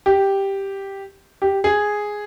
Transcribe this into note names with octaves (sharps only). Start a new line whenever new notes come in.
G4
G4
G#4